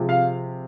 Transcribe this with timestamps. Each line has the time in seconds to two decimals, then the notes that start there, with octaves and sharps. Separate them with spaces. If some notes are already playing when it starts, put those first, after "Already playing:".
Already playing: C3 F3 G#3
0.09 F5